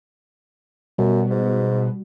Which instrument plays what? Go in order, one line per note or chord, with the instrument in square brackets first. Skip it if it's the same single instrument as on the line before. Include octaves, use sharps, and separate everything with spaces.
[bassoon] F#2 [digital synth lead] B2 [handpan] G3 F#4
[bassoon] G#2